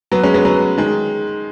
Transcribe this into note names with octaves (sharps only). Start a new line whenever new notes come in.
F#3 B3
G#3 C#4
F#3 B3
F#3 B3
D#3 G#3